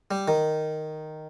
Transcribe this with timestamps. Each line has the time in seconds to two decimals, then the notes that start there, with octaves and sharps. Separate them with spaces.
0.11 G3
0.28 D#3